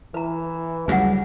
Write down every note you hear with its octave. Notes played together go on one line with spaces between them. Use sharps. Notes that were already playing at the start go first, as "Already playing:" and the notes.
E3 B4 A#5
D2 C#3 F#3 G3 F#5 G#5